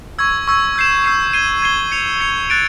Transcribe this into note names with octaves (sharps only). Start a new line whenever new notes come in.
C#6 E6 G#6
C#6 E6 G#6
E6 G6 C7 E7
E6 G6 C7 E7
G#6 C7 D#7 G7
G#6 C7 D#7 G7
G#6 C#7 F7
G#6 C#7 F7
F#6 A6 D7